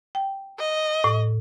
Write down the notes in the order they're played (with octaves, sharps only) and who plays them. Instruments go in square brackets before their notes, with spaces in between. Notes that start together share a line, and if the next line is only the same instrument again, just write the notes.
[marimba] G5
[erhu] D#5
[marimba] A2 C#6